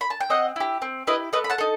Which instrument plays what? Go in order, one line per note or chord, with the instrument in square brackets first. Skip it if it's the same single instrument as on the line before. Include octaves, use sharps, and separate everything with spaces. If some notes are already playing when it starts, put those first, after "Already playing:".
[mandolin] B5
A5
G5
C4 D#5 F#5
E4 G4
C4
E4 G4 B4 D#5
A3 B4 D#5
B5
F#5 A5
D#4 A4